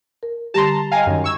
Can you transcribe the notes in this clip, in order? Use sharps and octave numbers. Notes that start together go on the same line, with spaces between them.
A#4
D3 G3 G4 A5 A#5 C6
D#5 F5 G5 G#5 A#5
F#2 D#3
C#6 E6 G#6